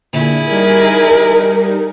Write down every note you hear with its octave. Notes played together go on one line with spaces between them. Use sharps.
A#2 D3 E4 G#4
G3 D#4 A#4